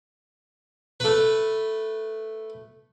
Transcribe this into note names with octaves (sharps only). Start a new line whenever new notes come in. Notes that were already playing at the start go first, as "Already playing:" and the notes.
A3 B4